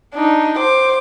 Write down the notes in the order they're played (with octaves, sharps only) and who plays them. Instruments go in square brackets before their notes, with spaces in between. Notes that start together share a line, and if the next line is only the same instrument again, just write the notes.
[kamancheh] D4 D#4
C5 D6